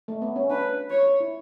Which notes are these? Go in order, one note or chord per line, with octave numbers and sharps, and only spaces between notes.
A3
B3
C#4
D4 B4
C#5
E4